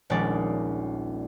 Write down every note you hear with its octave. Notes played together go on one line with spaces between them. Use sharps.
D#1 A#1 G#3 C#4 D5